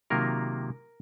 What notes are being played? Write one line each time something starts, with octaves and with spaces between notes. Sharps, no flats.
C3 D#3 F#3 A#3 F4 A#4